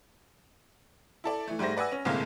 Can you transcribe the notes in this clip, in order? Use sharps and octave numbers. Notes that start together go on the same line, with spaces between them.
E4 A4 D5
E3 A3
G#2 G3 A3 C5 A#6
B4 D5 F#5 G#5 E6
C#4
G1 A2 C3 G#3 A#3 F5